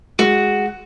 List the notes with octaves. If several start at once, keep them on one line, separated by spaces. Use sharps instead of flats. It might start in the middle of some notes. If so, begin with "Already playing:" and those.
G#3 F#4